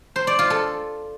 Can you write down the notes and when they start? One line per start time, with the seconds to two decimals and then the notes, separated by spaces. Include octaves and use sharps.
0.16 C5
0.27 D5
0.39 F4
0.50 A4